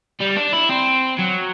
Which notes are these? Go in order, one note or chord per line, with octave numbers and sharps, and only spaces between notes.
G3
D4
E4
C4
F#3